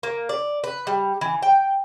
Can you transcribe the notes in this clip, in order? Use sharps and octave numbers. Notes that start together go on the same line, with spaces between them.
A#3
D5
B4
G3
E3
G5